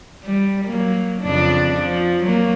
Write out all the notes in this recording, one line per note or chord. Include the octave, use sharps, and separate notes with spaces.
G3
F#3 A#3
F2 C#3 D4
F3
F#3 A#3